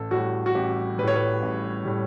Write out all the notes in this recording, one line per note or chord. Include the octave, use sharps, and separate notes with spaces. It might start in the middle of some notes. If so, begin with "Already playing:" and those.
Already playing: A1 A4
A2 G3 F#4
F#4
A1 G4
G3 B4
A2 C#5
B4
A1
A2 G3